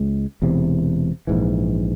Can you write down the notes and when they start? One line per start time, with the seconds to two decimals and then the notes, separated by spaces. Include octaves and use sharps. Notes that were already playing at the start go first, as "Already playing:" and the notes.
Already playing: C#2 G#3
0.42 E1 E2 C3
1.27 A#1 G#2 E3